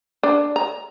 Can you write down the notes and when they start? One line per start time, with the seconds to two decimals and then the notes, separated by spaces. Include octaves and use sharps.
0.23 D4
0.56 A#5